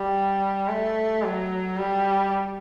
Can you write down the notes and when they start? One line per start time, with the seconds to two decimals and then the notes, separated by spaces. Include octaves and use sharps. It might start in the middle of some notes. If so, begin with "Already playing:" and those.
Already playing: G3
0.69 A3
1.23 F#3
1.77 G3